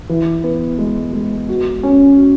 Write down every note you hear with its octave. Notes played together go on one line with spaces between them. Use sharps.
E3
B3
G#3
G#3
F#4
C#4
F#4